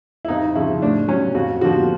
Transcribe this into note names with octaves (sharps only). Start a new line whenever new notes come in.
E4
F2 D#4
C#3 F3 E4
A2 D4
F#3 C#4
F2 F#4
D3 F3 F#4